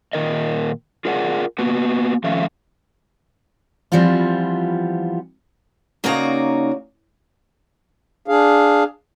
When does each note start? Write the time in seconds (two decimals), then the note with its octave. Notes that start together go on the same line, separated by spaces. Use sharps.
0.13 A#2 D#3 A#4 D#5
1.05 F4 G#4 A#4 D5 F#5
1.59 A#3 B3 F#4 B4
2.24 D#3 F3 A3 C#4 E5 F5
3.92 E3 F3 G3 B3 C4 F4
6.04 C#3 A#3 D#4 F#4 D5 A#5
8.28 D4 G#4 F5